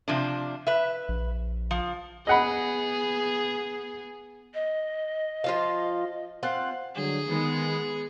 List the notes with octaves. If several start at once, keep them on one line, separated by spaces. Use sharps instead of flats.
C3 F3 D4
B4 E5
A#1
F3
B3 G#4 D#5 F#5 B5
D#5
F3 F4 F5
C4 F4 F#5
D3 F#3 G3 G#4
D#3 G#3 B3